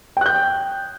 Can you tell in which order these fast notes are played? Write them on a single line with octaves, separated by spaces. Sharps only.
G5 F#6 G6